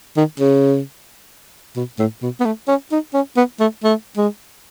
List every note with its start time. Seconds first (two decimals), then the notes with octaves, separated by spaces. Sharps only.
0.17 D#3
0.39 C#3
1.76 B2
1.99 A2
2.22 B2
2.40 B3
2.45 A3
2.68 C#4
2.92 D#4
3.14 C#4
3.37 B3
3.60 A3
3.83 A3
4.17 G#3